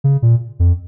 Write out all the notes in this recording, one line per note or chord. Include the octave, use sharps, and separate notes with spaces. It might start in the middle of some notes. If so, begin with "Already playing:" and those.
C#3
A#2
F2